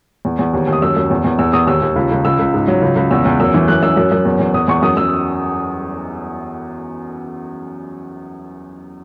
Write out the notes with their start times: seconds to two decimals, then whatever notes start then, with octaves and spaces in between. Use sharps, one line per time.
0.25 E2
0.39 E2
0.54 D#2
0.67 D#2
0.73 D#6
0.82 F#2 E6
0.97 F#2
1.11 E2
1.24 E2
1.39 E2 E6
1.53 E2 D#6
1.67 D#2 E6
1.82 D#2
1.96 C#2
2.11 C#2
2.25 C#2 E6
2.39 C#2
2.54 G#2
2.68 F#3
2.82 C#2
2.96 C#2
3.11 E2 E6
3.25 E2
3.40 F#2 E6
3.54 E3
3.68 F#2 F#6
3.83 F#2 E6
3.97 F#2
4.12 F#2
4.25 E2
4.39 E2
4.54 E2 D#6
4.68 E2 C#6
4.82 F#2 D#6
4.97 F#2 E6